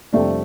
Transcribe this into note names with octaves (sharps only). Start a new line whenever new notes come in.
F2 C3 G3 A3 D4